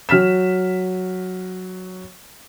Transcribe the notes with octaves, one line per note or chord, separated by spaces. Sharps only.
F#3 F6 B6 E7